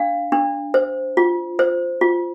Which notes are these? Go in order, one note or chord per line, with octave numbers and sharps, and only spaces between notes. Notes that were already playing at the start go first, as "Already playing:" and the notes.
Already playing: D4 F5
D4
C5
F4
C5
F4